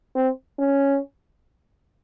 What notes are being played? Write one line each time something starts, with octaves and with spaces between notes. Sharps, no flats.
C4
C#4